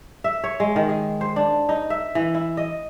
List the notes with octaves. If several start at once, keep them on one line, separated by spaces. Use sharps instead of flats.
E5
C#5
G#3
D#3
G#4
C5
D4
D#4
E5
E3
E4
D#5